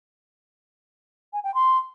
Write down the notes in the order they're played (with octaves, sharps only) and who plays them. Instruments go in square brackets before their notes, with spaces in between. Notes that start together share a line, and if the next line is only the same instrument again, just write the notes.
[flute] G#5
G5
C6